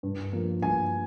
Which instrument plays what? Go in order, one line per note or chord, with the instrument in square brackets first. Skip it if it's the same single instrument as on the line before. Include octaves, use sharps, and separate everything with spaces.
[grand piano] G2
F3 A#3
G2 G#5